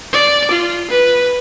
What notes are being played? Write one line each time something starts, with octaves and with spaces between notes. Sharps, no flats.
D5
F4
B4